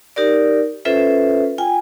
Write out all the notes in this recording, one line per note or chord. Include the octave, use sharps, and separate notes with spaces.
D#4 G4 A#4 D5
C#4 F4 A4 B4 C5 E5
F4 G5 G#5